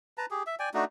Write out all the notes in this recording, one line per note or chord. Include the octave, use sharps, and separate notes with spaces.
B4 A5 A#5
G4 G#4
E5
D5 G5 G#5
A3 D4 D#4 F#4